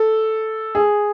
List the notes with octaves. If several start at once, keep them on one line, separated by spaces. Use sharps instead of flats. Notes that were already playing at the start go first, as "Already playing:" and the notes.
Already playing: A4
G#4